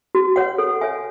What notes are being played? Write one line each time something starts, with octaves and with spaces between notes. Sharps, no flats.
F#4
C#5 F#5
A4
C#5 E5 G#5